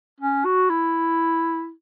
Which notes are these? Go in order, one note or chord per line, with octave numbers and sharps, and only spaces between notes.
C#4
F#4
E4